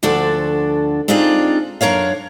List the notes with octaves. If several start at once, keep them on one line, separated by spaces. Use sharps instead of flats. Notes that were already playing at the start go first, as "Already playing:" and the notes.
D2 F3 D4 F#4 A4 D5
C4 D4 D#4 F4 G#4 D5
F#2 D4 A#4 C#5 F5